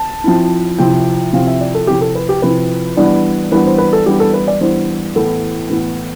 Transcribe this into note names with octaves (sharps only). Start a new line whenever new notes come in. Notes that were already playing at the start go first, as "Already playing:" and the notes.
Already playing: A5
F3 C4 E4
C3 F3 C4 E4 G5
C3 F3 C4 E4 F5
E5
D5
A4
C3 F3 C4 E4 G4
A4
B4
G4
C3 F3 C4 E4 B4
E3 G3 B3 D4
E3 G3 B3 D4 B4
C5
B4
A4
E3 G3 B3 D4 G4
A4
B4
D5
E3 G3 B3 D4 C5
A2 E3 B3 A4
A2 E3 B3